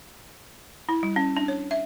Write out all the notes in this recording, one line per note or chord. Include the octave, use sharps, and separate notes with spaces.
E4
G3
C#4
D4
C#5
E5